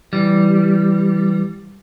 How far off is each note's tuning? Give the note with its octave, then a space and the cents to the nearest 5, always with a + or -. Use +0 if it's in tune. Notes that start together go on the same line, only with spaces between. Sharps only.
E3 +0 G3 -5